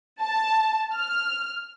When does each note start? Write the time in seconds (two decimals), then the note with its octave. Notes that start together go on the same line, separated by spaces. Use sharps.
0.23 A5
0.95 F6